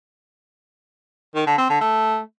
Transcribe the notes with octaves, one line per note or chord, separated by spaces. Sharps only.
D#3
D3
C4
D3
A3